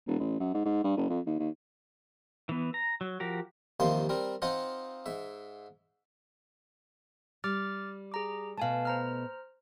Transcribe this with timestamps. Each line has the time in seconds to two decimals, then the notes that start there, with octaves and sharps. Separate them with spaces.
0.07 E1
0.19 A1
0.40 F#2
0.54 G#2
0.65 G#2
0.84 G2
0.97 F#1
1.09 F2
1.26 D#2
1.39 D#2
2.49 E3 B3
2.74 A#5
3.01 F#3
3.20 F3 F#4 G4 A#4
3.80 D#2 C3 D#3 F3 A#3 C6
4.09 G3 C4 A#4
4.42 C4 D#4 F4 C5 D#5 F#5
5.06 G#2 E5
7.44 G3 D6 F6 A6
8.12 G#4 A#5 D6
8.57 B2 A3 F5 G#5 A5
8.85 C5 A#5 F6